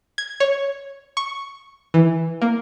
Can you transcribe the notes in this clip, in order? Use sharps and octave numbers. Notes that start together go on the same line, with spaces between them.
G#6
C#5
C#6
E3
A#3